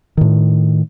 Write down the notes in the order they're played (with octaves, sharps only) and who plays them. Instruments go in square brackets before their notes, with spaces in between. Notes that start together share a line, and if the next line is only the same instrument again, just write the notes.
[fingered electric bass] A2 D#3